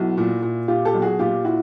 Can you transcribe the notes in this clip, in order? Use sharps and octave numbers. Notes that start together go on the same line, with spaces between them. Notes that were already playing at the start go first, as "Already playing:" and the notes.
Already playing: B1 E4 F#4
A#2
A#2
A#2 F4 G4
G4 A4
B1
F#4 G#4
A#2 F4 G4
E4 F#4